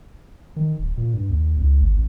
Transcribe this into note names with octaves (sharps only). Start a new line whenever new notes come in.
D#3
D1
A#2
G2
D#2
C#2
G#1
A1